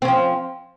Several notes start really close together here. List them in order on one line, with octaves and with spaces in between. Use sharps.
C4 C#4 F3